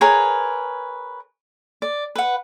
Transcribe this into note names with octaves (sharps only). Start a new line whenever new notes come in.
G#4 A#4 B4 C#5
D5
B4 F#5